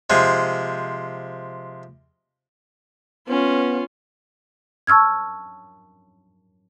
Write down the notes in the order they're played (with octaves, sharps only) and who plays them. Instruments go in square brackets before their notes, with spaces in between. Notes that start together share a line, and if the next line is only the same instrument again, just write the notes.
[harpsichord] C3 F3 G#3
[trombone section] B3 [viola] C#4 F4
[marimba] A5 C#6 E6 F6 G#6